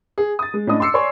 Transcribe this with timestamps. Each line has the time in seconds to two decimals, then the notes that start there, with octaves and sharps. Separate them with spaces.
0.18 G#4
0.39 D#6 A6
0.54 G#3
0.67 A2 C#4 D4 D#5 D#6
0.80 C6 D6 E6 C7 C#7
0.94 C#5 D5 G#5 C6 C#6